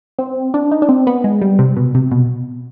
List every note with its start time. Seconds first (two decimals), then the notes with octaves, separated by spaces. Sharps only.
0.19 C4
0.54 D4
0.71 D#4
0.82 D4
0.89 C4
1.07 B3
1.24 G#3
1.42 G3
1.59 C3
1.76 B2
1.95 C3
2.11 B2